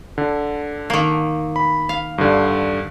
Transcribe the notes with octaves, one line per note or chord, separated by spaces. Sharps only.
D3
D#3 A#3
B5
F5
G2 D3